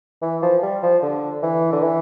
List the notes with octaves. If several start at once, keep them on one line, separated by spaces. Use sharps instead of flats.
E3
F3
G3
F3
D3
E3
D3
E3